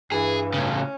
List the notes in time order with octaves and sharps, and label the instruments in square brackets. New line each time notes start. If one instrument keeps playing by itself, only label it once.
[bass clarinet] G2 [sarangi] E3 [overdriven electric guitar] G#4
[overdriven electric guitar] A2 C#3 [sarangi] C#4